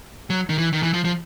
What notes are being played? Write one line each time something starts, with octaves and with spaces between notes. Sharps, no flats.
F#3
D#3
E3
D#3
E3
F3
F3